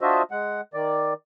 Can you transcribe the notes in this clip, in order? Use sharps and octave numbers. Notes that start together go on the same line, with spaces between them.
D4 F4 F#4 C5 D#5 E5
G#3 F#5
D#3 D5